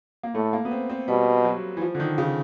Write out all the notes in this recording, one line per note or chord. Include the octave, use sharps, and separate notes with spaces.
A#3
A2 A3
A#3
B3
C4
C4
B2 G3
F#3
E3
F3
D3
D#3
C#3